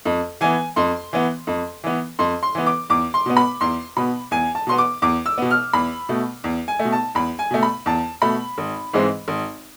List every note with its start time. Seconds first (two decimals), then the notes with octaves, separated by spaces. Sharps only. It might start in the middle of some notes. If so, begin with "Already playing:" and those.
0.05 F2
0.41 E3 B3 G#5
0.76 F2 C6
1.13 E3 B3
1.47 F2
1.84 E3 B3
2.19 F2 C6
2.43 C6
2.55 E3 B3
2.66 D6
2.90 E2 D6
3.14 C6
3.26 B2 B3
3.37 B5
3.61 E2 C6
3.97 B2 B3 B5
4.31 E2 G#5
4.55 A5
4.67 B2 B3 C6
4.78 D6
5.02 E2 D6
5.26 E6
5.38 B2 B3
5.50 F6
5.73 E2 B5
6.09 B2 A3
6.44 E2
6.68 G#5
6.79 A3
6.85 B2
6.92 A5
7.15 E2 B5
7.39 G#5
7.51 B2 A3
7.63 B5
7.86 E2 A5
8.22 B2 A3 B5
8.58 G#1
8.93 G#2 E3 G#3 C4
9.28 G#1